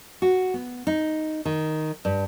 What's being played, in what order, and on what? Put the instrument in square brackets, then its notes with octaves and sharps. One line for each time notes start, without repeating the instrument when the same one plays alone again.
[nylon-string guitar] F#4
B3
D#4
D#3
G2